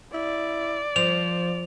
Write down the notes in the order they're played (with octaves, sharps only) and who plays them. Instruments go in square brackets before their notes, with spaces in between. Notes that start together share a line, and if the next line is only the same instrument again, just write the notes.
[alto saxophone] E4 [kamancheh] D5
[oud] F3 [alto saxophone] C5 [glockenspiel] F7